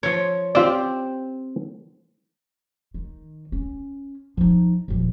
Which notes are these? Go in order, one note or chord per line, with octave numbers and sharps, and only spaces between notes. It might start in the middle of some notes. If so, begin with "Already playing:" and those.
F3 C#5
C4 F4 G4 D5
D#3
C#4
F3 D#4
D#1 F2